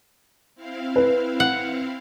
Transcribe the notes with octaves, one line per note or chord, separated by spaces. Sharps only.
C4 E4 F5
B4
F#5